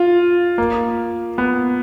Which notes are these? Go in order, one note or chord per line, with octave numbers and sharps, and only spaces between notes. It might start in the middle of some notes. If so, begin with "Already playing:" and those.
Already playing: F4
A#3
B3